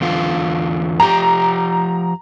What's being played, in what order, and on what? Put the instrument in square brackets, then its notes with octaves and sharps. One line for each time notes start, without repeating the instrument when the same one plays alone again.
[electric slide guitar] E2 D3 F4
[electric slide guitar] F3 G4 [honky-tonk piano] A#5